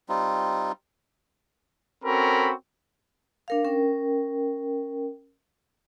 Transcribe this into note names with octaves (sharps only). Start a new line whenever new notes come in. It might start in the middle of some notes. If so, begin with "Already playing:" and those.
G3 C4 D#4 F4
C4 C#4 F#4 A4 A#4 B5
D4 A#4 F5
C#4 A#4 G5